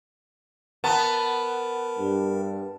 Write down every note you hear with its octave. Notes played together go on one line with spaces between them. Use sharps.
B3 A#4 A5
G2 G3